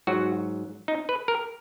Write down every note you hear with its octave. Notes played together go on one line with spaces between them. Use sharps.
G#2 F#3 F#4
D#4
B4
A#4